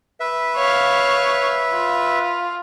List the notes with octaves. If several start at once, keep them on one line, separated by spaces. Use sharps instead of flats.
B4 E5
C#5 F5
F4